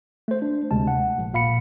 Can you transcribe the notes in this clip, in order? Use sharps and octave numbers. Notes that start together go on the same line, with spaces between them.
A3 C5
D4
D2 C3 G#3 A5
F#5
A#1
A#2 F5 B5 C#7